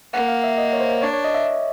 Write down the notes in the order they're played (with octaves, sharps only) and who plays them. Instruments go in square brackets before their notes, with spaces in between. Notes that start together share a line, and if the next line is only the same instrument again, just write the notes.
[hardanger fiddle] A#3 [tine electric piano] F#5
[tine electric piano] F5
E5
D#5
C#5
C5
[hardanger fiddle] D4 [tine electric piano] C#5
[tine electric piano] C#5
D#5
E5